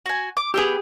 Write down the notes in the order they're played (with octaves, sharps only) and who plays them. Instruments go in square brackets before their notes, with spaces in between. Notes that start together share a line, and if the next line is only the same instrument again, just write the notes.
[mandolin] F#4 G#5
D6
[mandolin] B3 G5 E6 [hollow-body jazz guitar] G4 G#4